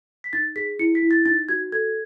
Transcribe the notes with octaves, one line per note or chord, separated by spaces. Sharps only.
B6
D#4 A6
G#4 B6
E4 C#7
B6
E4
A6
D#4 A6
F#4 G#6
A4 G#6